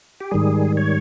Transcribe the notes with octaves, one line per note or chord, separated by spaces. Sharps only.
G4
G#2 D#3 G3 G#4
C#5